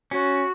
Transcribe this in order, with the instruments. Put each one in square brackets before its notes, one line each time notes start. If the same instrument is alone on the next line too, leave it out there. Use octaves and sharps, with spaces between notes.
[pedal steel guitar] C#4 [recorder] F#4